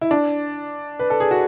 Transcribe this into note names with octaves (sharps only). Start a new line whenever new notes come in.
E4
D4
B4
A4
G#4
F#4